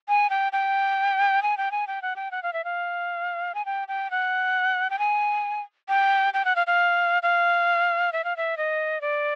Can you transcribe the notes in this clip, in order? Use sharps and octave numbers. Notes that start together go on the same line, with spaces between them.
G#5
G5
G5
G#5
G5
G#5
G5
F#5
G5
F#5
F5
E5
F5
G#5
G5
G5
F#5
G5
G#5
G5
G5
F#5
F5
F5
F5
E5
F5
E5
D#5
D5